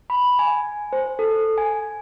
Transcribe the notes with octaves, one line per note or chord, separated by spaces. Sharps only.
B5
G#5
C5
A4
G#5